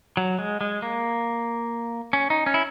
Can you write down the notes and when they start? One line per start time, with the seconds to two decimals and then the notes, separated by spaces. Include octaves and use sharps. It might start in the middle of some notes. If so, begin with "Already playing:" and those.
0.17 F#3
0.39 G#3
0.61 G#3
0.82 A#3
2.13 C#4
2.30 D#4
2.46 C#4
2.54 E4